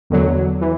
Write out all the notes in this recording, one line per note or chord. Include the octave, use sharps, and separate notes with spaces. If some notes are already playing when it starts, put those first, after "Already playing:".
E2 D3 F#3
E3